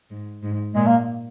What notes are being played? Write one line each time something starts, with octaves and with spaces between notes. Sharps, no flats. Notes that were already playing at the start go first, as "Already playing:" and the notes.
G#2
G#2
A#2 G#3
A#3